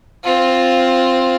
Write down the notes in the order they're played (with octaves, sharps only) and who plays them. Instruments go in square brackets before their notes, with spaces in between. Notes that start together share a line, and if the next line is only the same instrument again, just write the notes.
[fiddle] C4 F4